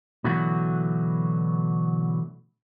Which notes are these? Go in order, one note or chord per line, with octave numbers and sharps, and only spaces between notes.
B2 D3 E3 F#3 A3 F#4